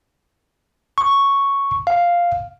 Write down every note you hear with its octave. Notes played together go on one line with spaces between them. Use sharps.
C#6
F5